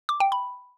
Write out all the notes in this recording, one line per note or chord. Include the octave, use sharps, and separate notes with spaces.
D6
G5
B5